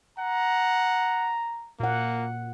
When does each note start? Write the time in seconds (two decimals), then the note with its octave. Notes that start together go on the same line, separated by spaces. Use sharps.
0.19 F#5 A#5
1.80 A#2 A#3 F#5